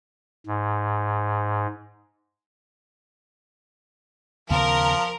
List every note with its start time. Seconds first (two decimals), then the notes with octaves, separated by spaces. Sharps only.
0.47 G#2
4.50 D#2 C#3 F3 B3 A#4 F5